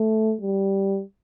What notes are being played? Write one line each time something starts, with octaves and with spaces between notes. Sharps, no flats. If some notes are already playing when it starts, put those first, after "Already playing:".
Already playing: A3
G3